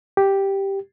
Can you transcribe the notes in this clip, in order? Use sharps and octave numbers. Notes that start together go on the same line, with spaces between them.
G4